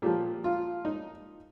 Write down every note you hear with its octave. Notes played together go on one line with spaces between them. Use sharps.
A#2 F3 G4
F4
D#4